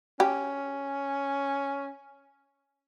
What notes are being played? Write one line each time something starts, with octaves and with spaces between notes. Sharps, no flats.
C#4 G4